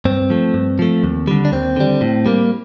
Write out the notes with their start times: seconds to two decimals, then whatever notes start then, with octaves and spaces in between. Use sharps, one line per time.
0.05 G2 C4
0.30 F3 A3
0.54 G2
0.79 F3 A3
1.03 D#2
1.28 D3 G3
1.45 D4
1.52 D#2 C4
1.76 D3 G3
2.01 A2
2.26 G3 A#3